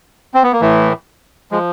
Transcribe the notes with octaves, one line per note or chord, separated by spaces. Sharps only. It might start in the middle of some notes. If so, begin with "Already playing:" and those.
C4
B3
A#3
A2 E3 A3
F3 G#3